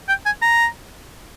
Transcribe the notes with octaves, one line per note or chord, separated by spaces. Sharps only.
G5
G#5
A#5